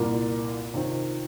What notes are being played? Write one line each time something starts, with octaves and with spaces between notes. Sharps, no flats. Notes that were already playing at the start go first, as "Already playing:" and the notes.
Already playing: C2 A#2 A#3 F4
C3 D#3 C4 F4